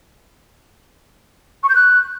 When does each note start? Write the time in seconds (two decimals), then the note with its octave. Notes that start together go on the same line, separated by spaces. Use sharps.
1.63 C#6
1.69 G6
1.75 F#6